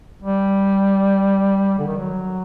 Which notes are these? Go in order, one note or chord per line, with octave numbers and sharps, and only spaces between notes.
G3
D3
D#3
F#3